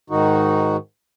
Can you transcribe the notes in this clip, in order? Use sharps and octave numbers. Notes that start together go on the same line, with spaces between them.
G#2 D#3 D#4 F#4